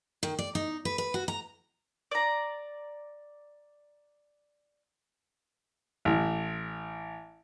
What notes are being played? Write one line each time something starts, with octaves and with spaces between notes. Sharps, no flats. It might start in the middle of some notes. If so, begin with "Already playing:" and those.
D#3
D5
D#4
B4
B4
F#4
A#5
D5 A#5
A1